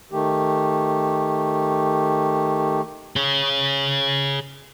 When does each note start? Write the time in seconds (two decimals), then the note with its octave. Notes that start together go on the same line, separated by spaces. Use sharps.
0.12 D#3 A3 G4
3.16 G#4 C#5